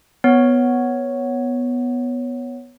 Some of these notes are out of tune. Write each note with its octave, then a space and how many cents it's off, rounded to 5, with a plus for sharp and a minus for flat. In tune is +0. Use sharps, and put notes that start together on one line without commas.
B3 +0 C#5 +0